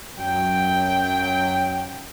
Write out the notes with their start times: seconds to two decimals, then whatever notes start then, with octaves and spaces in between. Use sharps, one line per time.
0.18 F#2 F#3 G5